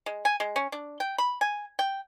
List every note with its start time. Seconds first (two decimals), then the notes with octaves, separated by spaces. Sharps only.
0.06 G#3
0.25 G#5
0.40 G#3
0.56 C#4
0.72 D4
1.00 G5
1.18 B5
1.41 G#5
1.79 G5